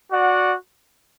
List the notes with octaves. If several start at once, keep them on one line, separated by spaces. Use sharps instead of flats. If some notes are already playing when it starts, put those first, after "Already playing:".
F#4 D5 F#5